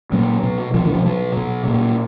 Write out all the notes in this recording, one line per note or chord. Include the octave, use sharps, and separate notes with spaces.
A#2 F#3
B2
B2 F3
E3
F3
B2 F#3
B2
A#2